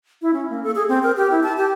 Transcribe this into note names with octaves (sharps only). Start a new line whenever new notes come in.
E4
C#4
A#3
A4
G#4
C4
A#4
G4
E4
A5
G4